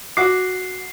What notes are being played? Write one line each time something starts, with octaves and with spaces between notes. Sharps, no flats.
F#4 D6 C7